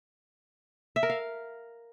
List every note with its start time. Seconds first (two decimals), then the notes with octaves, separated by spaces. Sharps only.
0.96 E5
1.03 A#4
1.10 F5